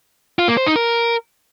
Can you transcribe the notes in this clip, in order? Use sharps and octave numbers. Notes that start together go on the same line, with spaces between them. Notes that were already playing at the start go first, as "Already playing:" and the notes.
F4
A#3
C5
D#4
A#4